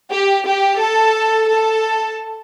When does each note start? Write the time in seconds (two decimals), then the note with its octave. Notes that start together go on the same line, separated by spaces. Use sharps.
0.12 G4
0.47 G4
0.82 A4
1.52 A4